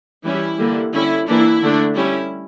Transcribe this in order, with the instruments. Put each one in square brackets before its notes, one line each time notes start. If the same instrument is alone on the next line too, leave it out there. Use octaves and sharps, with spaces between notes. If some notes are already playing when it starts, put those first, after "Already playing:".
[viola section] E3 G3 C#4 E4
D3 G3 A#3
D3 G3 C#4 E4
E3 A#3 D4 E4
D3 A3 D4
G3 C#4 E4